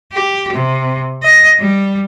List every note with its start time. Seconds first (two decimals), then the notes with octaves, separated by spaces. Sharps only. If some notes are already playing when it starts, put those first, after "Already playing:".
0.13 G4
0.53 C3
1.23 D#5
1.60 G3